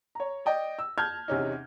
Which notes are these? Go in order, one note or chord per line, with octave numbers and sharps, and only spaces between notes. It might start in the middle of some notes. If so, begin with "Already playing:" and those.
C#5 A#5
D5 D#5 G5
E6
A5 F6 G6 G#6
E2 C3 C#4 D#4